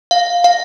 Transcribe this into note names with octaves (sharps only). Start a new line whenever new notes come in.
F5
F5